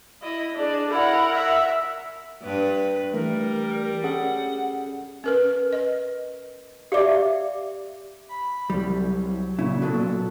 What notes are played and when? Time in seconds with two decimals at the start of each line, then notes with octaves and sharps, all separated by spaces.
0.22 E4 D#5
0.54 D4 G#4
0.91 E4 A#4 F#5
1.34 E5
2.42 G2 B4
3.14 E3 G3 A3 A#4
4.04 C#4 G#4 A4 F#5
5.24 C#4 A#4 B4
5.73 B4 D#5
6.92 G4 D5 E5 F5 D6
8.29 B5
8.70 C2 F#3 G3
9.59 A#2 C#3 E4
9.82 B2 F#3 A4